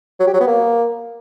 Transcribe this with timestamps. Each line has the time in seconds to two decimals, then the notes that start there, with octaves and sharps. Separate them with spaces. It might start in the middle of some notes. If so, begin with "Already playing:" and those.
0.20 F#3
0.27 G4
0.34 F#3
0.40 B3
0.47 A#3